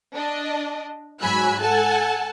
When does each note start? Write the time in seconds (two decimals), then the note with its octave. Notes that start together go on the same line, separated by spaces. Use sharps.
0.14 D4 D#5
1.21 G#2 F#3 G#5 B5 E6 F#6
1.61 A4 F#5 G#5 A5